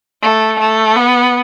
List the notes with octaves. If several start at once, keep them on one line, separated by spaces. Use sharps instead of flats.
A3
A3
B3